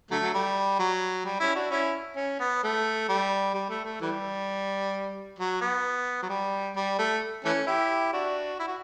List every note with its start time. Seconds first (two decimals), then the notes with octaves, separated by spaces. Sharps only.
0.11 D3 F#3 A3
0.23 F#3
0.34 G3
0.79 F#3
1.25 G3
1.40 C#4 E4
1.55 D4 F#4
1.71 C#4 E4
2.16 C#4
2.40 B3
2.63 A3
3.09 G3
3.54 G3
3.69 A3
3.85 A3
4.01 E3 G3
5.39 F#3
5.61 B3
6.23 F#3
6.29 G3
6.76 G3
6.99 A3
7.45 E3 A3 C#4
7.67 E4 G4
8.13 D4 F#4
8.59 E4
8.67 F#4